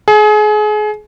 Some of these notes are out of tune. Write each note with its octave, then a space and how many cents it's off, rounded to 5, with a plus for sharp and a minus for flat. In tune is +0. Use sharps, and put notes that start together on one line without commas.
G#4 +30